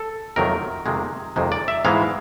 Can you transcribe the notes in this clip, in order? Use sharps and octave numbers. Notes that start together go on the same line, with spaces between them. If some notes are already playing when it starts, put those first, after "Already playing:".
Already playing: A4
F2 C3 D#3 F#3 A3 A#4
F2 C3 D#3 G#3
F2 C3 D#3 G#3
D5
E5
G#2 E3 G#3 B3 F5